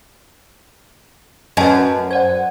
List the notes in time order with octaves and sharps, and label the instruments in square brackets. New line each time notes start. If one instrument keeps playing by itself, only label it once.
[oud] F#2 [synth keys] C#4 B4 [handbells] D#5 G#5 A5
[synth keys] C5 F#5 [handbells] D5 G#6